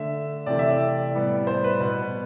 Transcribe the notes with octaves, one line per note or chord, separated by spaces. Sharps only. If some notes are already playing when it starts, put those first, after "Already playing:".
Already playing: D3 A3 E5
C3 E3 A3 D5
E5
D5
A2 G3 B3
C5
B4
B2 B3